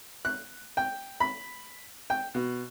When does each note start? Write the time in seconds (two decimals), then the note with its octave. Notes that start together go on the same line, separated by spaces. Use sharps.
0.25 F#6
0.77 G5
1.20 B5
2.10 G5
2.35 B2